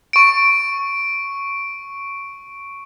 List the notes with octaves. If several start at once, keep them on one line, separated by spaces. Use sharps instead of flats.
C#6 D7